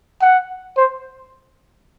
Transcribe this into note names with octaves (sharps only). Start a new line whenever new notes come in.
F#5
C5